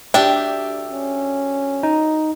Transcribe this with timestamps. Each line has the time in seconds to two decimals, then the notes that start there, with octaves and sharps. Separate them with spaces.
0.14 D2 D4 G4 E5 G5
0.91 C#4
1.83 D#4